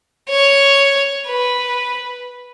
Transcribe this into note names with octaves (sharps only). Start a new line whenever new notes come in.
C#5
B4